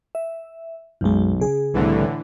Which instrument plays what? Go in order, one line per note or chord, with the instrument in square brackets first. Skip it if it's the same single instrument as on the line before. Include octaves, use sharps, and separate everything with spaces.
[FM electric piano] E5
[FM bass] B1 [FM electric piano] F#2 G#3
[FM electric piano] C#3 G#4
[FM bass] C2 [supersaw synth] A2 D3 E3